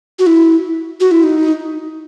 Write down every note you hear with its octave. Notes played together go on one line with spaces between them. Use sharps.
F#4
E4
F#4
E4
D#4